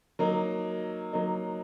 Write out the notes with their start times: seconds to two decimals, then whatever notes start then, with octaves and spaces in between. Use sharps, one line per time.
0.19 F#3 A#3 D#4
1.13 F#3 A#3 D#4